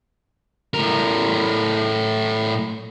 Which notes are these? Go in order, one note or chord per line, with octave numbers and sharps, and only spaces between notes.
A2 A#4